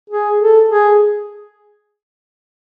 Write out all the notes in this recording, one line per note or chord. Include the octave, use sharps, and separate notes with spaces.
G#4
A4
G#4